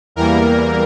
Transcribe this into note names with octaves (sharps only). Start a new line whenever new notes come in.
E2 E3 G3 A#3 A#4